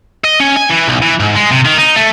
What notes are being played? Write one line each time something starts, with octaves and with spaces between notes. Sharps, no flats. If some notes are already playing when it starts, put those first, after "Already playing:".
D#5
C#4
G#5
E3
B1
E3
G#2
G#3
C3
D#3
D#4
A3